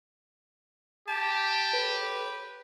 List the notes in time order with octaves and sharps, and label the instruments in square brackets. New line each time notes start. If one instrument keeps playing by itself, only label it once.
[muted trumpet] G4 [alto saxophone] A5
[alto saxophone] B4